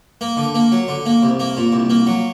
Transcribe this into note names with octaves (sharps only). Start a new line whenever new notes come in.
A#3
D3
A#3
F#3
D3
A#3
C2
A#3
A#2
C2
A#3
F#3